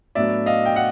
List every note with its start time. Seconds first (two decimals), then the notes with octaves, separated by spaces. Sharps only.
0.15 A2 F#3 B3 D4 D5 E5
0.46 D#5 F5
0.65 G5
0.76 F#5